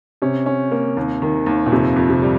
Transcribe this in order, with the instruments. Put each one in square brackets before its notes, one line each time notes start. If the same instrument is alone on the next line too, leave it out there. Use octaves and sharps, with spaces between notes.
[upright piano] C3 [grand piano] C#4
[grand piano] C#4
A#3
D#2
D#3
D#2
[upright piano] A#2
[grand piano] F2 [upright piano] C3
[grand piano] F2
[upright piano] C3
[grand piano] G3